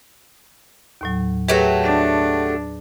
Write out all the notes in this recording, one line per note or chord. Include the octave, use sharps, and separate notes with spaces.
D#2 A2 F#3
F#3 A3 G4 G#4 B4 E5
D4